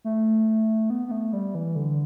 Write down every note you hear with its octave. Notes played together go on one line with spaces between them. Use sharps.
A3
B3
B3
A3
G3
E3
D3